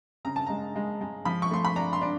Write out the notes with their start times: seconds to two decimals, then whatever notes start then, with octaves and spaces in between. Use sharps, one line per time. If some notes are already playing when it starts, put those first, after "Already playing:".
0.25 C#3 A#5
0.36 A5
0.47 G#3 A#5
0.76 G#3
1.01 G#3
1.25 F3 B5
1.42 C#6
1.51 A3 C6
1.65 B5
1.76 D4 A#5
1.93 C6
2.01 D4